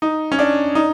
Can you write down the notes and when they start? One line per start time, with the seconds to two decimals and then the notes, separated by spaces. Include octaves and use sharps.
0.02 D#4
0.32 C#4
0.39 D4
0.75 D#4